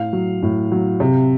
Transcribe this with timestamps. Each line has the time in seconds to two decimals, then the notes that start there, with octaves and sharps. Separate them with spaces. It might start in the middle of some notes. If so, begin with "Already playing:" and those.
Already playing: A2 F5
0.13 F#3
0.42 A2
0.72 F#3
1.00 C3